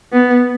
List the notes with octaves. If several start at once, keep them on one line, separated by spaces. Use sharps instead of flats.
B3